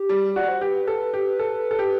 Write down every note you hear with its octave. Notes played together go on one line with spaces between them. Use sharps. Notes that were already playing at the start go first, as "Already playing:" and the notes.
Already playing: G4
G3
F#4 D5
C5
G4 B4
A4
G4
A4
A4
G4